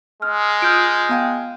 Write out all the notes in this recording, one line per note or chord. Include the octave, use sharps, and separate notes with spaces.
G#3 F6
F4 F6 G6 D7
B3 F5 G5